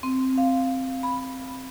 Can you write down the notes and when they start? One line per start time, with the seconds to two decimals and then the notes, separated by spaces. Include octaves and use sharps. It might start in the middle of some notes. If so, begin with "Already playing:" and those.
0.03 C4
0.38 F5
1.03 B5